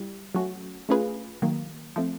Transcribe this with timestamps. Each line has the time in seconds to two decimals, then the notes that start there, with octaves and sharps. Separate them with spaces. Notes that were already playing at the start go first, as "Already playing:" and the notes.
Already playing: G3 E4 G4
0.35 F#3 A3 C#4 F#4
0.89 A3 C#4 F4 G#4 B4
1.42 D#3 F#3 A#3
1.96 F3 A3 C4